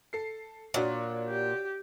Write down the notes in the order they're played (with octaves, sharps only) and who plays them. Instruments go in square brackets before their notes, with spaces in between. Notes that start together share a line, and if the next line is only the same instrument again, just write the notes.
[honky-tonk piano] A4 C7
[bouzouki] A#2 [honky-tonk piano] D4 F#4 C#5
[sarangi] G4